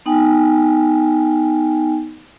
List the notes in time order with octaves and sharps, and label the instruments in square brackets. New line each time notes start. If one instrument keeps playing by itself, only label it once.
[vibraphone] B3 D#4 G5 G#5